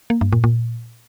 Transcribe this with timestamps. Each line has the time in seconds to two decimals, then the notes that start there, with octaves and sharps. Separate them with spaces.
0.10 A#3
0.21 G2
0.33 A#2
0.44 A#2